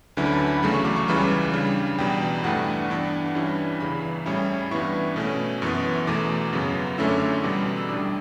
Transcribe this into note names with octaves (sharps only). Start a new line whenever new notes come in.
D2 D3 F#3 C#4 E4 B4
B5
A5
B5
E2 C#3 F#3 A3 B5
C#6
D6
C#6
C#2 C#3 E3 G3 B5
C#3 G3 D4
E2 B2 G3 G5
G2 E3 A3 D4 F#5
G2 E3 B3 D4
G2 E3 G3 C#4 E4
E2 C#3 E3 B5
A2 G3 C#4 E4
G2 E3 B3 E4 C#6
B2 A3 C#4
F#2 E3 B3 C#6
E2 B2 A3 D6
F#2 C#3 F#3 B3
F#2 D3 A3 C#4 E4 E6
D6
E6
E2 B2 G3
E6
A2 G3 D4 D6